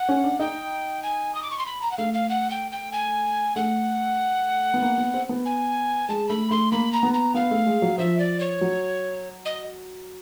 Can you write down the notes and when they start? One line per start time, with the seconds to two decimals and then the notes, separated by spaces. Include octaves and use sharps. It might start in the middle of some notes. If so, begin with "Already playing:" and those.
Already playing: F#5
0.09 C#4
0.24 D4
0.39 D#4 G5
1.03 G#5
1.35 D#6
1.43 D6
1.50 C#6
1.58 C6
1.66 B5
1.82 A#5
1.91 F#5
1.98 A3 F5
2.14 F5
2.29 F#5
2.50 G5
2.71 G5
2.92 G#5
3.56 A3 F#5
4.74 B3
4.82 A#3
4.98 B3
5.14 C4
5.29 B3
5.45 G#5
6.09 G#3 A5
6.29 A3 B5
6.51 A3 C6
6.72 A#3 B5
6.93 A#5
7.03 B3
7.14 A#5
7.34 B3 F5
7.51 A3
7.66 G#3
7.82 F#3
7.98 F3 E5
8.19 D5
8.40 C#5
8.61 F#3
9.45 D#5